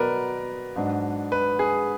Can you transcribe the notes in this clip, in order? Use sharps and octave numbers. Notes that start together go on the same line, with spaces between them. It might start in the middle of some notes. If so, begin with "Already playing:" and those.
Already playing: B2 F#3 B3 A#4 B4 D5
G#2 F#3 D4
B4
G#4